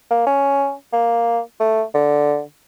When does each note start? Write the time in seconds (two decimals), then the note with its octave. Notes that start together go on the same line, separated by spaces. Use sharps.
0.11 A#3
0.27 C#4
0.93 A#3
1.60 A3
1.94 D3